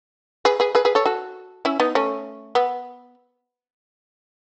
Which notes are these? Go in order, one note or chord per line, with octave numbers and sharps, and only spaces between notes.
G#4 B4
G#4 B4
G#4 B4
G#4 B4
A4 C#5
F#4 A4
C#4 E4
B3 D#4
A3 C#4
B3